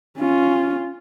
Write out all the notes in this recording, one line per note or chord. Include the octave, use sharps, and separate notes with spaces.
C#4 F4